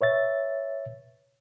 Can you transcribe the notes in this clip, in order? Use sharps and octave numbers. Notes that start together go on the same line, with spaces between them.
B4 C#5 E5 A6